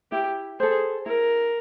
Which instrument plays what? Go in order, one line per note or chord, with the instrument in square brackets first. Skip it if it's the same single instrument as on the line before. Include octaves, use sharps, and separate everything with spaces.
[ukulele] E4 [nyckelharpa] G4
[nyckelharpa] G#4 [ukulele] A4 C5
[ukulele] E4 [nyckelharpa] A#4